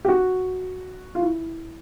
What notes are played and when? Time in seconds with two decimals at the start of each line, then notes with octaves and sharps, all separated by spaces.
0.05 G4
0.08 F#4
1.15 F4
1.22 E4